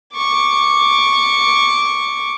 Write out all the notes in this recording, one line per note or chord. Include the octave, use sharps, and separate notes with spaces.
C#6 D6